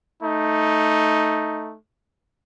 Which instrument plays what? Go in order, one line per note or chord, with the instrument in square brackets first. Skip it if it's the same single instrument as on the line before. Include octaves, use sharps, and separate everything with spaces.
[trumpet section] A3 D#4